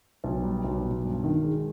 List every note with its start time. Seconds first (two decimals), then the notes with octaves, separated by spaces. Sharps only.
0.24 B1
0.43 G3
0.64 B1
0.84 B2
1.04 G2
1.24 D#3
1.44 G#3